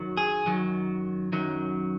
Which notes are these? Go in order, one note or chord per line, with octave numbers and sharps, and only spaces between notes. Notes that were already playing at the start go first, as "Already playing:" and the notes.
Already playing: F#2 D#3 F#3
G#4
F#2 D#3 F#3
F#2 D#3 F#3